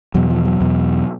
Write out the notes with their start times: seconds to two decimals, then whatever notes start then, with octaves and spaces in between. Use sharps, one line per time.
0.14 E2 B2 F#3
0.30 F3
0.45 F#3
0.61 E2 B2